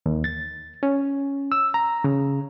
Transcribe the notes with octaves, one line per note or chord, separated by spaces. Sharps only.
D#2
A6
C#4
E6
A#5
C#3